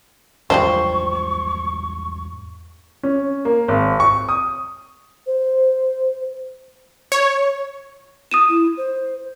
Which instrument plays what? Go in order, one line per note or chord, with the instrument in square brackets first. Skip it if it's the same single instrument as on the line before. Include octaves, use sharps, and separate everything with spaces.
[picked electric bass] E2 G#2 G3 [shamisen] F3 D4 G4 [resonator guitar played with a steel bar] C5 [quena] C#6
[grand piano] C#4
A#3
G#1
C#6
D#6
[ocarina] C5
[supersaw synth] C#5
[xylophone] D#6 D#7 E7
[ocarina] E4
C5